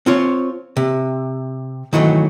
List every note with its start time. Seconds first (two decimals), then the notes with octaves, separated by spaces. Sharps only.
0.06 C4 F4 C#5
0.77 C3
1.93 D#3 E3 F#3 A3